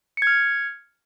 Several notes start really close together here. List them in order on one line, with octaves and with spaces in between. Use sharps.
C#7 G#6 F6